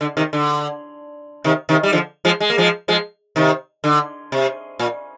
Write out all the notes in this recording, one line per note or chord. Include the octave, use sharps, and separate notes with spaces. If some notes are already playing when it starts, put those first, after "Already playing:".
D3
C3 D#3
D3
C3 D#3
C3 D#3
G3
D3 F3
F3 G#3
G#3
A#3
F3 G#3
F3 G#3
C3 D#3
D3
C3
A#2